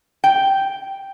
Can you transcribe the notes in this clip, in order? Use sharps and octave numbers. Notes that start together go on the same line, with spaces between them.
G5